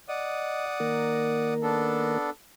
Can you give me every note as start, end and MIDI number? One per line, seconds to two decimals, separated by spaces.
0.09 1.54 74
0.09 0.66 75
0.09 1.54 78
0.09 1.54 87
0.80 2.18 51
0.80 2.18 58
0.80 2.18 70
1.63 2.30 59
1.63 2.30 62
1.63 2.30 69